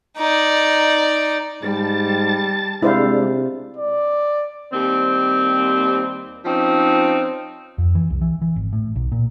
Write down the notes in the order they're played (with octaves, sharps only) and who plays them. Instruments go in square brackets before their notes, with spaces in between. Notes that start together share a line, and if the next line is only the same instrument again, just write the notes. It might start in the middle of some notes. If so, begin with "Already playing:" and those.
[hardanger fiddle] D#4 D5
[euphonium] G#2 [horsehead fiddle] G3 [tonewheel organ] A5 A6
[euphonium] C3 [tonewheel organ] G#3 D4 [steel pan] E4 C5 F5
[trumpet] D5
[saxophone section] D#2 G3 C4
F3 C4 C#4 D#4
[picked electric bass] F2
E3
C2
E3
E3
G#1
A2
B1
A#2